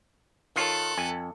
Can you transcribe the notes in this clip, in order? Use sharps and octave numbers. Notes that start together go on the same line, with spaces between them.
D#3 F4 A4 C#5 F#6
F2 G#5